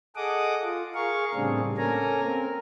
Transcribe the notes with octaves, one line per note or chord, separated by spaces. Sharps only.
G#4 A4 D#5 F#5 D6 D#6
F4
G#4 A#4 F5 C#6
A2 C#3 G3 C4 D4 G#4
A#3 C#4 A4 A#4 G#5 A#5
C4 A#4